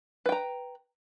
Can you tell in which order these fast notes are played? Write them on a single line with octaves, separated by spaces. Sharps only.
B4 G5 A#5